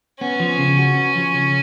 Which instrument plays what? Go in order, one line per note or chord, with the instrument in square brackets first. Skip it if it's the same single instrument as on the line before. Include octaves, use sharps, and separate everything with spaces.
[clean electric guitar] B3 [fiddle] C#4
[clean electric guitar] F3
C#3
F#4
B3
F3
C#3